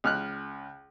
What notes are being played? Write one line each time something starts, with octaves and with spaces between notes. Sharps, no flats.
C#2 F6 F#6